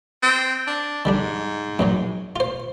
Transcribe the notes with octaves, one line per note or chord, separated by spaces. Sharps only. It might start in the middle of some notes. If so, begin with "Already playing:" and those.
C4
D4
G#2 D3 G3 D4
F#2 A#2 F#3
F4 C5